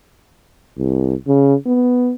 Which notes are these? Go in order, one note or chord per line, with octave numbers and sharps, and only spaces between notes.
C2
C#3
B3